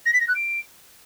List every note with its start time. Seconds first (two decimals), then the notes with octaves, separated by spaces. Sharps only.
0.06 A#6
0.13 B6
0.20 A#6
0.28 F#6
0.35 D7